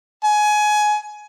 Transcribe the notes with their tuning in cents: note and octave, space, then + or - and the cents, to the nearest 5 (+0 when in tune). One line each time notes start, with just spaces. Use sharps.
G#5 +20